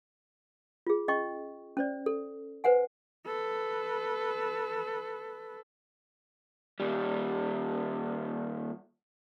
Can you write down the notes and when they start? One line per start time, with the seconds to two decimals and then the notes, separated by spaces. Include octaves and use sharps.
0.87 F4 G#4
1.08 C#4 D#5 G5 C#6
1.77 C#4 C5 D5
2.06 A4
2.64 B4 C5 F#5 G#5
3.25 A4 B4
6.80 D#2 G3